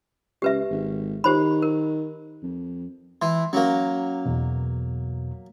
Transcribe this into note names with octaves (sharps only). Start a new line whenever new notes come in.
C#2 G4 B4 E5
G#1
D#3 G4 C5 B5
A#4
F2
E3 C6
F#3 A#3 C#4 F#4
E2 B2